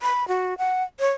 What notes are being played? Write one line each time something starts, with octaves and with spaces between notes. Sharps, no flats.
B5
F#4
F#5
C#5